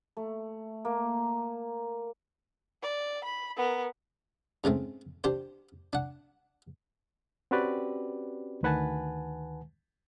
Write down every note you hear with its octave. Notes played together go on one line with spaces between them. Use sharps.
A3
A#3
D5
B5
B3 A#4
G#2 C#3 A3 C4
D4 G4 C5
D4 F#5
C4 C#4 F#4 G4 B4 D5
D2 D#3 B4 F#5 G#5 A5